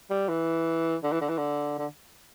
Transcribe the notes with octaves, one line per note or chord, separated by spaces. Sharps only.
G3
E3
D3
E3
D3
E3
D3
D3